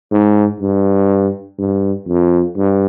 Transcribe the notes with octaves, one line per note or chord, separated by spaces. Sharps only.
G#2
G2
G2
F2
G2